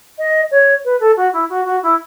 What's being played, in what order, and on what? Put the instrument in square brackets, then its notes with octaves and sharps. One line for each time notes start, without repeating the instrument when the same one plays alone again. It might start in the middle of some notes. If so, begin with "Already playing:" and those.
[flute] D#5
C#5
B4
A4
F#4
E4
F#4
F#4
E4